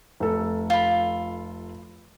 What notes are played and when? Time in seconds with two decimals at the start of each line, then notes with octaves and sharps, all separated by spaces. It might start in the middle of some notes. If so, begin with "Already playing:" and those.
0.20 F1 A4
0.70 F4 B5